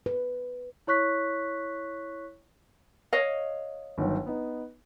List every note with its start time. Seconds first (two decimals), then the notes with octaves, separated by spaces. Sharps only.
0.06 B4
0.87 E4 C#5 C#6 F#6 B6
3.13 C#5 D#5 F5
3.98 G1 D#3 F#3
4.26 B3 D#4